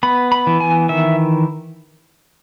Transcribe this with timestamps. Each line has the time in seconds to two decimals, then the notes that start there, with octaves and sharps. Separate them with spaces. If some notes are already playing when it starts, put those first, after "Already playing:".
0.03 B3 B5
0.32 B5
0.47 E3
0.60 G#5
0.89 D#3 E5